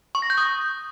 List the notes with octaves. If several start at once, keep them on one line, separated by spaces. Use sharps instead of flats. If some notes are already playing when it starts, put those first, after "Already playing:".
C#6
A#6
G6
D#6